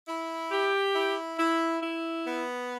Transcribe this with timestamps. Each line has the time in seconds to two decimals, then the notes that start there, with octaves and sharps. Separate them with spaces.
0.08 E4
0.52 G4
0.94 E4
1.38 E4
1.82 E4
2.25 B3